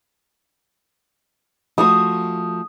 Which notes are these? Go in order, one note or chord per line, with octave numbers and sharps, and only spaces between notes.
F3 A3 F#4 D#6